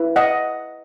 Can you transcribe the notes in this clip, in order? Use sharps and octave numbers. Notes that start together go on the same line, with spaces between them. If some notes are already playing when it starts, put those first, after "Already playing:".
Already playing: E4 B4
D#5 F#5